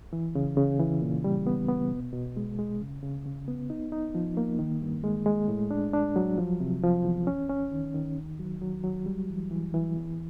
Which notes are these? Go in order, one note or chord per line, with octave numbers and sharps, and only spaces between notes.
E3
C#3
C#3
E3
A#2
G3
B3
B3
B2
B2
G#3
G#3
C#3
C#3
C#3
B3
D#4
D#4
F3
A#3
D#3
G2
G#3
G#3
A2
D4
D4
F#3
F3
C3
F3
E2
C#4
C#4
D#3
D#3
D#2
F#3
F#3
F#3
G3
E3
E3
E3
E2